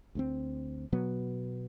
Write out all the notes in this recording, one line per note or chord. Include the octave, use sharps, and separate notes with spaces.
D2 G#3 C4
B2 F#3 B3